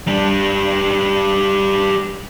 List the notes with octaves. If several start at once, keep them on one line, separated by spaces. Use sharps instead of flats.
G3 D4